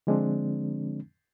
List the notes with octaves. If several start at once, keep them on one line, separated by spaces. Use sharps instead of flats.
D3 F3 G#3 C4 D4